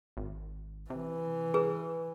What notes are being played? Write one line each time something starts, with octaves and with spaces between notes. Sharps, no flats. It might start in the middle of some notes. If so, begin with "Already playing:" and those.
G#1
C3 E3
G#4 B4